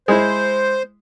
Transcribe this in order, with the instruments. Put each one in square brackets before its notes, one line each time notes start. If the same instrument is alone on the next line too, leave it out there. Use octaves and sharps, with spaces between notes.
[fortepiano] G#3 E4 [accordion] C5